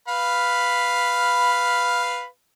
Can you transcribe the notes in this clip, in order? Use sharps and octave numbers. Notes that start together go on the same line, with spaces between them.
B4 F5 B5